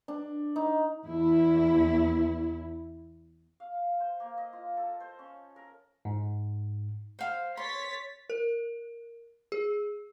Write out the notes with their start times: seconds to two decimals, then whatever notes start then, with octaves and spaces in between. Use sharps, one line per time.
0.08 D4
0.56 D#4
1.06 E2 E4
3.60 F5
4.00 C5
4.20 A#3
4.38 D#5
4.53 F4
4.77 A4
5.00 C5
5.19 C#4
5.56 A#4
6.05 G#2
7.19 C5 F5
7.57 C#5 C6 A6 B6
8.30 A#4
9.52 G#4